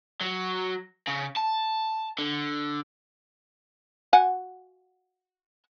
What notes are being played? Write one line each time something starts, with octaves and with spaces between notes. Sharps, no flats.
F#3
C#3
A5
D3
F#4 F#5 G#5